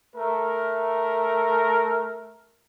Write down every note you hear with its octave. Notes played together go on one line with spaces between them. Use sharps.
A3 A#4